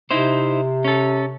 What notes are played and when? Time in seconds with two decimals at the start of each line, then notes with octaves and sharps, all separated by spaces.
0.11 C3 D#4 E4 C5
0.85 C#4 A4